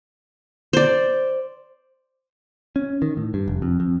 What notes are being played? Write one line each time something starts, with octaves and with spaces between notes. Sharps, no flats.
C5 D5
C#4
D#3
A2
G2
F1
F2
F2